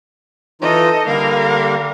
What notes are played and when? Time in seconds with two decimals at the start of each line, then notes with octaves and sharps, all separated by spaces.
0.62 E3 D#4 F4 A4 D#5
1.06 D3 G3 A#3 A#4 F5